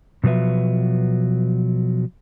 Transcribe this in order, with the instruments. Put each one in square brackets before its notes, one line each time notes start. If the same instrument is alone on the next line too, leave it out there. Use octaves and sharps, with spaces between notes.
[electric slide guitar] B2 F3 F#3 B4 E5